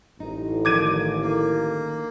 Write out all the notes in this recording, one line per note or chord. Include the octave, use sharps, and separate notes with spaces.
A1 D#4
D3 D#3 F3 D6 G#6 D#7
A#3